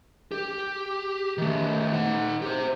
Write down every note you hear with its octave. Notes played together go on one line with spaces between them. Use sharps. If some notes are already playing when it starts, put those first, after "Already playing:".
G4
D#3 A3
D#4 F#5
G4 C5